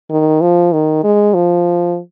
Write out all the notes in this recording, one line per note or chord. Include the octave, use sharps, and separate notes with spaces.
D#3
F3
D#3
G#3
F3